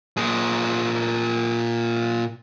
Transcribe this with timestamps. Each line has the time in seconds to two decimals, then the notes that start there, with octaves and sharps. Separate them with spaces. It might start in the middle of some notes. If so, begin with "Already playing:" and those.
0.17 A#2 G#4